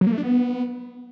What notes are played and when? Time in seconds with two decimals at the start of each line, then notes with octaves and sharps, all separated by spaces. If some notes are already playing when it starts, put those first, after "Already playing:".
0.01 F#3
0.07 A#3
0.12 A3
0.18 D4
0.23 B3